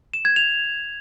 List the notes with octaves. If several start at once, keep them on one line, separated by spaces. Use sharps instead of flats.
E7
G#6
F7